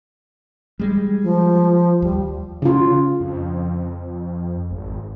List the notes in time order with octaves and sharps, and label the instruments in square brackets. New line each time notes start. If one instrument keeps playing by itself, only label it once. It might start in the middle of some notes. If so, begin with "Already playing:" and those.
[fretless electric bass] G3 G#3
[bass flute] F3
[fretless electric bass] D#2 [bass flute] G3
[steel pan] C#3 F4
[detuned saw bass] F2
G#1